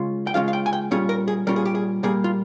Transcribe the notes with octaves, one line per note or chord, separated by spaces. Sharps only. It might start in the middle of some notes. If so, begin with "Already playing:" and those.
Already playing: C#3 G#3 C#4 F4
G5
C#3 G#3 C#4 F4 F5
F5
G5
G#5
G5
A#2 G3 C#4 F4 G#4
A#4
G#4
A#2 G3 C#4 F4 A#4
G#4
G4
G#4
A#2 G3 A#3 G#4
F4